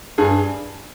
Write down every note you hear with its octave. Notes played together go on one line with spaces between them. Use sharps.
G2 G#4